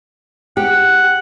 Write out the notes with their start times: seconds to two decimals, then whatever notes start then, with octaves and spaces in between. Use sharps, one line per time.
0.57 G4 F#5